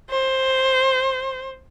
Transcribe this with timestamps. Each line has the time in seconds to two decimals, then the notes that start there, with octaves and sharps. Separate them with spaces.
0.10 C5